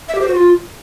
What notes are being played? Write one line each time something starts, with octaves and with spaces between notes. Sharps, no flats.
E5
G4
C5
F#4
F4